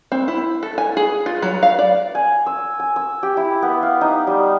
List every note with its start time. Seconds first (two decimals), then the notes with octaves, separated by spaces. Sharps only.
0.12 C4
0.28 E4
0.63 A4
0.78 G#5
0.97 G#4
1.26 F4
1.42 F#3
1.63 F5
1.79 D5
2.15 G#5
2.46 E6
2.80 G#5
2.96 E6
3.23 G4
3.37 E4
3.62 B3
3.83 F5
4.01 D#4
4.27 G3